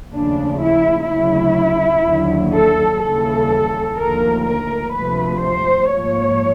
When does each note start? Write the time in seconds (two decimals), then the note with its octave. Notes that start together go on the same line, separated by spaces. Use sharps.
0.13 D#2 C#3 F3 A3 D4
0.61 E4
1.09 D2 C#3 F#3 E4
2.05 D#2 D3 F#3
2.54 A4
3.01 D#2 C#3 E3 G3 A4
3.98 D#2 D3 F3 A3 A#4
4.46 A#4
4.94 D2 C3 F3 A3 B4
5.43 C5
5.91 G#2 F3 A#3 C#5